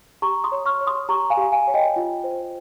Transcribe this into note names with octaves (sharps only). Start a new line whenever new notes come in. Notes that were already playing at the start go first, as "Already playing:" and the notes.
G4 A#5 C#6
C6 D#6
C#5
C#6 F6
C#5
C6 D#6
G4 A#5 C#6
F5 G#5
G4
F5 G#5
C#5
D#5 G5
F4
C5